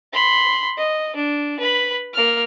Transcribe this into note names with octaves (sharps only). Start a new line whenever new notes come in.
B5 C6
D#5
D4
B4 B5
A#3 F6